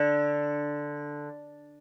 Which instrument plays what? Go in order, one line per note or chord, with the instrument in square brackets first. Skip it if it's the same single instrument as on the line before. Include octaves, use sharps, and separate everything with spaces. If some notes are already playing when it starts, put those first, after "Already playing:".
Already playing: [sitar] D3